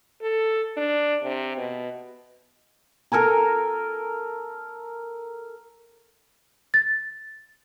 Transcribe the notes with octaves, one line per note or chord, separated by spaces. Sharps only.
A4
D4
C3
B2
A4 A#4 G#5 A#5
A6